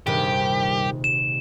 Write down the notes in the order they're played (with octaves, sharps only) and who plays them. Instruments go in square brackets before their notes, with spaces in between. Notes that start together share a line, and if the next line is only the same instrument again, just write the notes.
[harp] D#1 C3 G#4 [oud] G2 D#3 [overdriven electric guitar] G4
[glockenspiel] E7